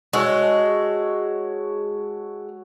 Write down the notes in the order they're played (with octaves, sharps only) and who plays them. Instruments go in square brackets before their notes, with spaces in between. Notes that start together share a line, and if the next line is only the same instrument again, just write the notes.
[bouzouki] G#3 [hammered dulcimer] F#4 A4 C#5